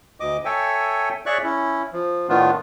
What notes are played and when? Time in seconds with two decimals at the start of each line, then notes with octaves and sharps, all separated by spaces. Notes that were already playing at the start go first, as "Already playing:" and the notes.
0.20 D2 D#5 D6
0.45 A4 C#5 E5 G5 G#5
1.26 G#4 C#5 D5 E5 C#6 F#6
1.44 C#4 E4
1.93 F3
2.29 A2 D#3 A3 B3 D4 F4